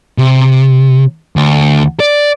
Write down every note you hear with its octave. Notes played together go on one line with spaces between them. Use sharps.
C3
D2
D5